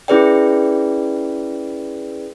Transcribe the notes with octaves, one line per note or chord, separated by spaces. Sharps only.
C#4 E4 G#4 B4 D5 G5